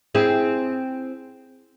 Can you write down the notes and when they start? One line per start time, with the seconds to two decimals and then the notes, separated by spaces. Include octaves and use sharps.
0.15 C4 E4 G#4